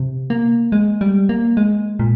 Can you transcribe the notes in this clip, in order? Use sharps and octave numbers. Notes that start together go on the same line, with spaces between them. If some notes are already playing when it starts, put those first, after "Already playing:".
Already playing: C3
A#3
G#3
G3
A#3
G#3
A#2